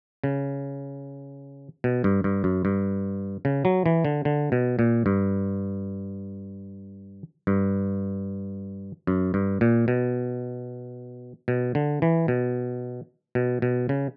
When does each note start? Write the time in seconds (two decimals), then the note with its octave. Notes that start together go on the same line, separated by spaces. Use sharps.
0.24 C#3
1.84 B2
2.04 G2
2.24 G2
2.44 F#2
2.65 G2
3.45 C#3
3.65 F#3
3.86 E3
4.05 D3
4.25 D3
4.52 B2
4.79 A#2
5.06 G2
7.47 G2
9.07 F#2
9.34 G2
9.61 A#2
9.88 B2
11.48 B2
11.75 D3
12.02 E3
12.28 B2
13.35 B2
13.62 B2
13.89 C#3